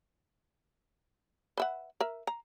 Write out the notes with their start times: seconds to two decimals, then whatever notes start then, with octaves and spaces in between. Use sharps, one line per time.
1.57 B4 E5 F#5
2.00 A#4 E5
2.27 A#5